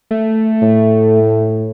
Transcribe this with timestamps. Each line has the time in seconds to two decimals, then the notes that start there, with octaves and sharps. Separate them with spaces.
0.11 A3
0.62 A2